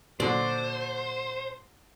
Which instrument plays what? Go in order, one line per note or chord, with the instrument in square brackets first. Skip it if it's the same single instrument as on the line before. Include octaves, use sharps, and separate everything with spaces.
[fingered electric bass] A#2 [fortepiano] D3 F#3 [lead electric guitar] C5 [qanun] D5